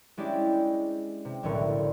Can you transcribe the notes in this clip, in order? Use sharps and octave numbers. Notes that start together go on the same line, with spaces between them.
G#3 C#4 D4 E4 G4
C3
F1 B1 A2 D3 A#4 C#6